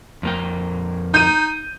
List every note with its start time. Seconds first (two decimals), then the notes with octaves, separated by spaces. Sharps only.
0.23 F2 A#3 G5
1.14 D#4 G6 D#7